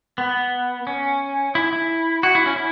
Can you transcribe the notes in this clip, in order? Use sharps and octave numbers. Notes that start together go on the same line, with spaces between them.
B3
C#4
E4
E4
F#4
E4
C#4
E4